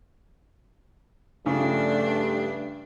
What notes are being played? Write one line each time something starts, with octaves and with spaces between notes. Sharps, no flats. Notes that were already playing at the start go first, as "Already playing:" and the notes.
G2 C#3 F3 A3 D4